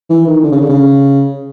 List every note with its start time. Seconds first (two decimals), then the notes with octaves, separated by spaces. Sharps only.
0.10 E3
0.27 D#3
0.44 D3
0.52 C#3
0.61 D3
0.69 C#3